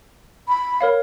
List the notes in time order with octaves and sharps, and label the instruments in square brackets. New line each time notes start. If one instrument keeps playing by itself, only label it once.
[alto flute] B5
[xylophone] A#4 C#5 F5